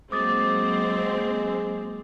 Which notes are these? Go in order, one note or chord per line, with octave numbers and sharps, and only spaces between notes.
F#3 G#3 A#3 C4 C5 D6 D#6 A6